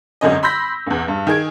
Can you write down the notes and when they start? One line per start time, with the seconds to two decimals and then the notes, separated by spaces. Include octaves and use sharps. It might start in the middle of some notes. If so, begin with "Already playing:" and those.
0.21 G#1 F#2 D3 C#4 D#5
0.43 B5 C6 E6 G6 A#6 B6
0.87 A1 E2
1.08 G2
1.27 D#3 G#4 G#6 D7